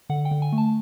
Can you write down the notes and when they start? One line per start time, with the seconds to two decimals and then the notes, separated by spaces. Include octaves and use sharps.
0.10 D3 F#5
0.25 G5
0.31 D3
0.42 G#5
0.52 A3
0.58 A5